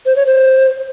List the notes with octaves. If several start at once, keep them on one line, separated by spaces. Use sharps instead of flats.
C5
C#5
C5